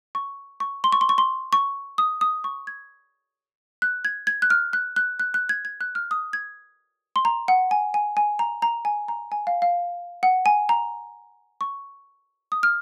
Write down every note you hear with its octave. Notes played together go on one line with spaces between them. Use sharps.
C#6
C#6
C6
C#6
C6
C#6
C6
C#6
D#6
D#6
C#6
G#6
F#6
G#6
G#6
F#6
F6
F#6
F#6
F#6
F#6
G#6
G#6
F#6
F6
D#6
G#6
C6
A#5
F#5
G#5
G#5
G#5
A#5
A#5
G#5
A#5
G#5
F5
F5
F#5
G#5
A#5
C#6
D#6
F6